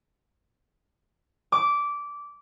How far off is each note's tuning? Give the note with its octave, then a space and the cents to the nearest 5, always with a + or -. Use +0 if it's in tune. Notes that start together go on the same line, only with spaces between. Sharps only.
D6 -15